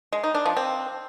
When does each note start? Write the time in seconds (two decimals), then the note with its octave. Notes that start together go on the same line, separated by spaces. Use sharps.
0.13 G#3
0.24 D#4
0.35 D4
0.46 F3
0.57 C4